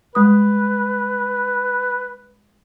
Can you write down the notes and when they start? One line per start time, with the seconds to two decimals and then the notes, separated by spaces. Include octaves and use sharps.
0.15 G3 G#3 B4 D#6